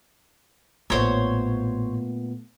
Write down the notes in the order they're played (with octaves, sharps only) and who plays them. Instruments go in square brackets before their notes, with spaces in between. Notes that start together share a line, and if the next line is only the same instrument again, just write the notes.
[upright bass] A1 [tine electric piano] A#2 A3 B3 [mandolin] C5 C#5